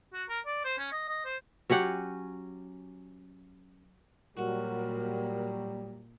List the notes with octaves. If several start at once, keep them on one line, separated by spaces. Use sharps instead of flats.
F#4
A#4
D5
C5
C#4
D#5
D#5
C5
F#3 C#4 G4 F#5
A#2 F#3 G3 F#4 A#4